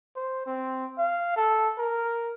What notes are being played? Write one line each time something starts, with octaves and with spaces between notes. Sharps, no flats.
C5
C4
F5
A4
A#4